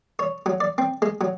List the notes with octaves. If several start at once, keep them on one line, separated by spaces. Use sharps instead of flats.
C#5
F#3
D5
C4
G#3
F#3